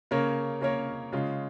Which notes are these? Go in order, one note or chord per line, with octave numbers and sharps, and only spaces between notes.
C#3 A#3 C#4 A#4 C#5
C#3 A#3 C#4 A#4 C#5
C#3 G#3 F4